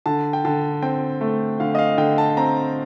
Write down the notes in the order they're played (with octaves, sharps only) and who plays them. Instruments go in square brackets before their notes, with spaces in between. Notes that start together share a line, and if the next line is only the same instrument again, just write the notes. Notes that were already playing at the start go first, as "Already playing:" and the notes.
[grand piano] D3 A5
G5
D3 A5
C4 G5
A3
D3 F5
D#5
F5
D3 G5
A5
C4 A#5